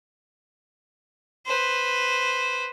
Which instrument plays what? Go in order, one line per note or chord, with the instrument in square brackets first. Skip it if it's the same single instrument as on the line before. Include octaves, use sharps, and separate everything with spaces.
[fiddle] B4 C5